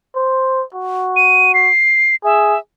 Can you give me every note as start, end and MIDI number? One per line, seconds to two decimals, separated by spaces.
0.15 0.63 72
0.75 1.70 66
1.16 1.52 99
1.54 2.15 96
2.24 2.56 68
2.24 2.59 76